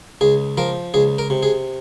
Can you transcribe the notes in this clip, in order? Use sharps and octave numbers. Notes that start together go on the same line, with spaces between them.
C#2 G#4
F3 A#4
C#2 G#4
A#4
C3
G#4